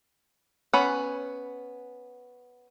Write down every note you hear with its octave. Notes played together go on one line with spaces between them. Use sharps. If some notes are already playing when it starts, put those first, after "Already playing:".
B3 C#4 F#5 B5